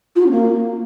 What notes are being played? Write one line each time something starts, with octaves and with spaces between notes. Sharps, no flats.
F4
F#4
C#4
A#3